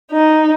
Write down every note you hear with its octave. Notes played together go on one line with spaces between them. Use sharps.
D#4